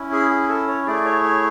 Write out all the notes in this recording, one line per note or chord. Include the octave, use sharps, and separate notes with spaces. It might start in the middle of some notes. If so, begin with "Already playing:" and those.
Already playing: C#4 E4
G#4
G#4
A4
C#5
A3 E4 G#4 D5
C#5
C#5